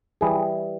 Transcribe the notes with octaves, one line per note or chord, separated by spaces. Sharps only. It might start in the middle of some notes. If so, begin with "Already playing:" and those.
E3 G3 G#4